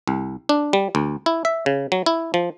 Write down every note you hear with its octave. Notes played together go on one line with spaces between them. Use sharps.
C2
D4
G3
D2
E4
E5
C#3
F#3
E4
F3